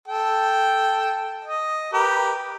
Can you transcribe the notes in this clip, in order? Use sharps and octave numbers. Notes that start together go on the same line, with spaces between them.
A4 G5
D#5
G4 A#4 B4